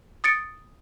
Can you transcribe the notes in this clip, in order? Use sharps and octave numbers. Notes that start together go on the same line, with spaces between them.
D#6 A6 C#7 D7